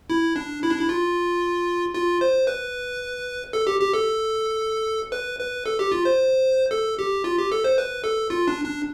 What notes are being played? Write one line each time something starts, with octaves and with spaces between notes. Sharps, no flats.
E4
D4
E4
D4
E4
F4
F4
C5
B4
A4
G4
G4
A4
B4
B4
A4
G4
F4
C5
A4
G4
F4
G4
A4
C5
B4
A4
F4
D4
D4